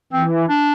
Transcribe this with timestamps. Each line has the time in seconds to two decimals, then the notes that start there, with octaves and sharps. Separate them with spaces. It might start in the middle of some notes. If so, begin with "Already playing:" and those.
0.13 E3 C4
0.49 D4